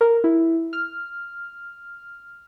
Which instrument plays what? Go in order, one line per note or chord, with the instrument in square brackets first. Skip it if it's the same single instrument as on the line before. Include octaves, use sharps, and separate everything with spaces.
[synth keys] A#4
E4
F6